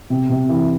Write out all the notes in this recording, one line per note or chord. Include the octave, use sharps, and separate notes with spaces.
C3
C3
E3